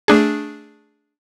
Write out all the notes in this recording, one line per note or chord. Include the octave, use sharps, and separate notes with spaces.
A3 D4 G#4